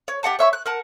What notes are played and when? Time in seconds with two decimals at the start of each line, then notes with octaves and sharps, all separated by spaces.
0.08 C#5
0.23 G4 D#5 F#5 A5
0.39 C#5 E5 C#6
0.53 F#6
0.66 A#4 F#5 A5